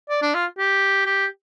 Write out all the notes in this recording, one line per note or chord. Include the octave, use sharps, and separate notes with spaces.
D5
D4
F4
G4
G4